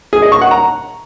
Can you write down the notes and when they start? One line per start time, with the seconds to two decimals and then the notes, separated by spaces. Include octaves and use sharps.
0.13 G#4
0.22 D#5
0.32 C#6
0.41 F#5
0.51 A#5